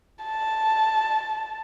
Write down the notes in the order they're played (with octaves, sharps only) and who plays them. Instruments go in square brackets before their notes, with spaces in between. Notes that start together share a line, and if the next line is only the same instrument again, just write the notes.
[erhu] A5